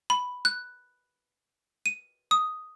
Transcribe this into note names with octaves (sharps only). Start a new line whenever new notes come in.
B5
F#6
D#7
D#6